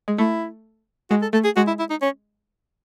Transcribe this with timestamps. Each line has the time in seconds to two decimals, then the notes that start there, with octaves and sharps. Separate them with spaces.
0.08 G#3
0.18 A3 E4
1.10 G#3 F#4
1.22 A4
1.33 A3 A4
1.44 G#4
1.56 G#3 F#4
1.67 E4
1.79 E4
1.90 D#4
2.02 C#4